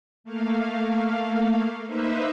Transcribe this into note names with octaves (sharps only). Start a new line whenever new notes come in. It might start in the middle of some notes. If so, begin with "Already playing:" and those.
A3 A#3 F5
A#3 D#4 B4 C5 E5